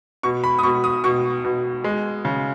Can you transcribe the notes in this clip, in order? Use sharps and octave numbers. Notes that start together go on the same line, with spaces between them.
B2 C#6
B5
D#6
B2 C#6
D#6
B2 C#6
B2
G#3
C#3